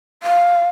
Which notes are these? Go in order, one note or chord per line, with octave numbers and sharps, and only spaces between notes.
F5